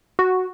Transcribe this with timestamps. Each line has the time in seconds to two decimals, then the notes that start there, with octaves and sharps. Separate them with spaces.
0.19 F#4